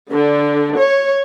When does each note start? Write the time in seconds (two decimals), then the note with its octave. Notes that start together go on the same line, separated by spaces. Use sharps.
0.11 D3
0.78 C#5